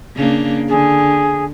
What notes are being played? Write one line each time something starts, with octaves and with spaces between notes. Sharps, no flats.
C#3 A#3 D4
D3 G#4